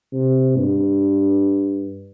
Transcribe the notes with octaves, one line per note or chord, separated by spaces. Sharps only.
C3
G2